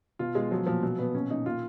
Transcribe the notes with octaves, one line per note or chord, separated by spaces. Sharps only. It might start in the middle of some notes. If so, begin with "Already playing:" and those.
B2 F4
B2 G#3
F3 F#3
A#2 F3
B2 F#3
B2 B3
A#2 C#4
A#2 D#4
A#2 F4